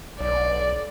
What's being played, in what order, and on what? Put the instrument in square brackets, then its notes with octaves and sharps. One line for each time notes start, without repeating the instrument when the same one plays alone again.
[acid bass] B1 [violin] D5